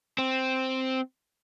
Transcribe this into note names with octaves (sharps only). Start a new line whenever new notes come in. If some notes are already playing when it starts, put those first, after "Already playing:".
C4